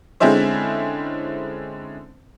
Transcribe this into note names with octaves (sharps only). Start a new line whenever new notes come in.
D3 G#3 C4 C#4 E4 C5